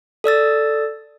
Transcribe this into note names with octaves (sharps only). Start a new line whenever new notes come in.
A4 D5 E6 A6